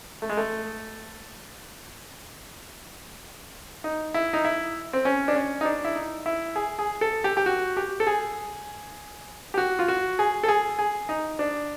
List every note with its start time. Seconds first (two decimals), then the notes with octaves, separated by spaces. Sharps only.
0.22 A3
0.29 G#3
0.37 A3
3.84 D#4
4.14 E4
4.33 D#4
4.45 E4
4.93 C4
5.05 C#4
5.28 D4
5.35 C#4
5.61 D#4
5.65 D4
5.85 E4
5.96 D#4
6.26 E4
6.56 G#4
6.79 G#4
7.01 A4
7.24 G4
7.37 G4
7.46 F#4
7.77 G4
8.00 A4
8.07 G#4
9.54 G4
9.58 F#4
9.79 F4
9.88 F#4
10.19 G#4
10.43 A4
10.48 G#4
10.79 G#4
11.09 D#4
11.39 D4